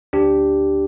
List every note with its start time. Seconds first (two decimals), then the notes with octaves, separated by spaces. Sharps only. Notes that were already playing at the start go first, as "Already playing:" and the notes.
0.13 D2 D4 G4